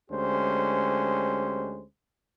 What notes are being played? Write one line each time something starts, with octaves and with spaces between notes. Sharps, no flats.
D2 G#3 C#4 G4 C5